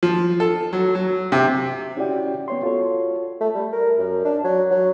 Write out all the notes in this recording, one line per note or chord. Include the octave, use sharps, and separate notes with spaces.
F3
A4
F#3
F#3
C3
C#4 E4 F#4 G4 D5 G5
B3 C#5 C6
F4 F#4 A4 C#5
A3
G3
A#4
F#2
D4
F#3
F#3